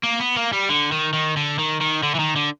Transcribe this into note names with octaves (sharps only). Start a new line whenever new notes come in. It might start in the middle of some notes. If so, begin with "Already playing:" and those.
A#3
B3
A#3
G3
D3
D#3
D#3
D3
D#3
D#3
D3
E3
D#3
D3